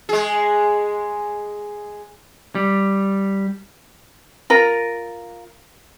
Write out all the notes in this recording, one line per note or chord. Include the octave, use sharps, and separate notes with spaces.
G#3 G#4
G3
F4 A#4